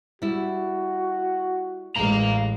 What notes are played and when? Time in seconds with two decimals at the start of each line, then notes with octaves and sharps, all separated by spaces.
0.22 G3 E4 F#4
1.96 A1 G#3 D#4 F5 A#5